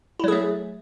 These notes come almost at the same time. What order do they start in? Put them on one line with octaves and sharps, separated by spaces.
E4 F#3 G#4 A3